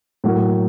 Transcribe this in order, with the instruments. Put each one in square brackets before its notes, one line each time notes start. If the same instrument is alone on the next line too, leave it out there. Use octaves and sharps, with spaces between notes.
[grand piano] A2 F#3 A#3